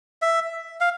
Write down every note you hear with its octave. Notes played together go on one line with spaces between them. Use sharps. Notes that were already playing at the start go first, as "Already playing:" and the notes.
E5
F5